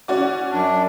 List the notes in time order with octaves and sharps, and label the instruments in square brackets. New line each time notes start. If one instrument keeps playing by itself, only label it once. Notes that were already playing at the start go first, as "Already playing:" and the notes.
[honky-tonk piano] C#4 F#4 D5
[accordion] F#2 D4